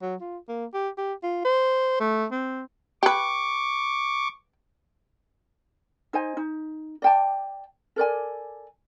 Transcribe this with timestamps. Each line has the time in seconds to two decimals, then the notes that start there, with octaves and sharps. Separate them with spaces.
0.02 F#3
0.21 F4
0.48 A#3
0.74 G4
0.98 G4
1.23 F4
1.45 C5
2.00 A3
2.31 C4
3.03 G4 B4 C#6 D6
6.13 D#4 C5 D#5 G#5
6.37 D#4
7.02 D5 G5 A5
7.96 A4 A#4 D5 G#5